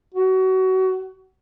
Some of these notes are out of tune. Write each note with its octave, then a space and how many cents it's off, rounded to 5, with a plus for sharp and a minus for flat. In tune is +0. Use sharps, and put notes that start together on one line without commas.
F#4 +25